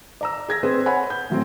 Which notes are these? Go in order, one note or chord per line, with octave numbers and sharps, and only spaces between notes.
D5 A#5 E6
G#4 G#6 A#6
C4 G#4 B4 C5
C#5 F#5 G#5 B5
G6
A2 F#3 C4